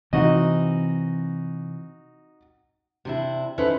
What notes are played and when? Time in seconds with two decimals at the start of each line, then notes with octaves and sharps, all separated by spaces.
0.13 C3 E3 C4 D#4 F#4 D#5
3.05 C3 D4 E4
3.58 C#4 D#4 E4 A4 B4 C5